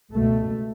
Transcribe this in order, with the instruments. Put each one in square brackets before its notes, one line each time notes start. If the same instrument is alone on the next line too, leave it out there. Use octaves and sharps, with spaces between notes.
[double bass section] C#2 B2 A3